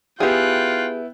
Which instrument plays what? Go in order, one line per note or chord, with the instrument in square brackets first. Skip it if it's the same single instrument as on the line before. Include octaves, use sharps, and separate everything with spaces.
[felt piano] B3 E4 [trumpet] F4 [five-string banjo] G4 G#4 [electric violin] G5 F#6